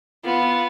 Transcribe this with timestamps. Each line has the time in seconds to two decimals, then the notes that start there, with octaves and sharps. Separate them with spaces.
0.25 B3 F4